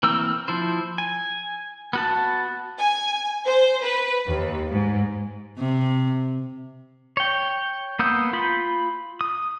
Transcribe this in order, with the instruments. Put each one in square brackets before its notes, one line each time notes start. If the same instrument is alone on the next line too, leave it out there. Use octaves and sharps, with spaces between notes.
[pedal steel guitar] E3 A#3 C4 E6
F3 E4 C5
G#5
B3 F#4 A5
[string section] G#5
C5
B4
D#2
G#2
[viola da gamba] C3
[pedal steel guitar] C#5 G5
A#3 B3 D#6 E6 G6
F4 B5 G6
D#6